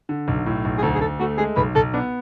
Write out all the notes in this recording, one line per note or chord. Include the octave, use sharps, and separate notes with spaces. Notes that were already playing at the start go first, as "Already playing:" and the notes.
D3
B1
A2
B1
G#4
D2 A4
G#4
D2 A4
A3 F#4
G#3 G#4
B1 B4
B1 A4
B3 D4